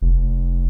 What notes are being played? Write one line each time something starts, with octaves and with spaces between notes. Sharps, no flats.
F1